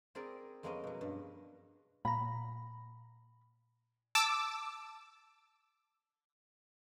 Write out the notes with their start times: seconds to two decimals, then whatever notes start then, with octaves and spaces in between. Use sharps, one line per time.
0.15 C4 G#4 A#4 D5 B5
0.63 F2 G#3 A#3 B3 C#4 D#5
0.84 B2 F#3
1.01 G2
2.05 A#2 A#5 B5
4.15 A5 D6 E6